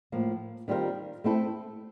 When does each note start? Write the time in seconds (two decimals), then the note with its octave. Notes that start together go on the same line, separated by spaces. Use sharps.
0.12 A2 F3 A#3
0.68 D#3 G3 C4 F4 A#4
1.24 A3 C4 E4 A4